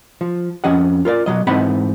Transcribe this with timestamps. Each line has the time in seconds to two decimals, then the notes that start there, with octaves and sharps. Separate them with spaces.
0.21 F3
0.64 F2 F3 C#4 D#5 F#5
1.05 F4 A#4 B4 D5
1.26 B2 F#3 D#5
1.47 G#2 E3 C4 D#4 F#5 B5